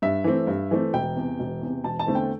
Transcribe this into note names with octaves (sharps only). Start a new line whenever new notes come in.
G2 E5
E3 A3 C4
G2
E3 A3 C4
E1 G5
E2 C3
E1
E2
C3
E1 A5
A5
E2 D3 A3 C4
G5